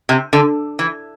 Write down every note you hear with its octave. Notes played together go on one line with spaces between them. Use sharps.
C3
D3
E3